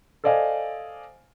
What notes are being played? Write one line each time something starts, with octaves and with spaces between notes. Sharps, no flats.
A4 C5 D5 D#5 F5 G#5